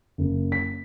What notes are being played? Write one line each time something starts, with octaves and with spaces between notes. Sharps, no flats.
F#1
B6